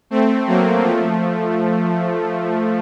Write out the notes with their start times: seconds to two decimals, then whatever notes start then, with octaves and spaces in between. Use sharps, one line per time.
0.10 A3 C4
0.47 F#3 A#3
0.83 F3 A3